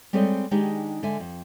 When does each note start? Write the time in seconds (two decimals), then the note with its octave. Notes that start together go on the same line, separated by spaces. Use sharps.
0.13 G3 G#3 C4 A4 C#5 D#5
0.51 D#3 G#3 D4 D#4 G4 G#4
1.03 D3 G#3 E5 G#5
1.20 F2